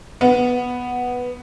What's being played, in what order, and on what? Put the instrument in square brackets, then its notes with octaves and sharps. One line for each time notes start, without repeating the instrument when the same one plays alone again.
[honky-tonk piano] B3